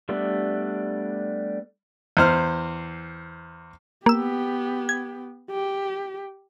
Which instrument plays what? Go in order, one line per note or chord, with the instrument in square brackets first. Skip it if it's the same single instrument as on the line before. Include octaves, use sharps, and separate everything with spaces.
[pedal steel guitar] G3 A3 B3 D4
[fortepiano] E2 C5 F6
[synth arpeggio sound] A#3 E6 [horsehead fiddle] B3 G4
[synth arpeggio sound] G#6
[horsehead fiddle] G4